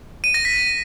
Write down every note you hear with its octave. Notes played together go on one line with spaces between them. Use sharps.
D#7
A#6
B6